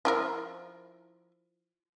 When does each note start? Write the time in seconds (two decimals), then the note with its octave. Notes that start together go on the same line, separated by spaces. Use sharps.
0.05 F3 E4 A#4